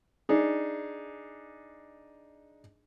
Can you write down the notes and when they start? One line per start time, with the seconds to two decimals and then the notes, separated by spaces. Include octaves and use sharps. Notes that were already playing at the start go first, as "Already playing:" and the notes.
0.29 D4 D#4 G#4